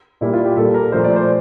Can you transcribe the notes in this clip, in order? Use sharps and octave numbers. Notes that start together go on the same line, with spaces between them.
A#2 G3 A#3 E4
F4
G4
A#2 G3 A#3 A4
A#4
A#2 F3 A3 C5
D5
C5